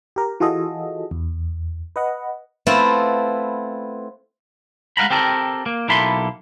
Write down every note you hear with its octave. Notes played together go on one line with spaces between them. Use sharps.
G4 A#4
E3 F4 F#4 G#4 A4 D#5
E2
B4 D#5 F#5
A3 B3 C4 E4 F4
G#3 F5 F#5 A#5 B5
C4 G4 A4 A#4
A#3
B1 A#3 E4 A4 B5 C6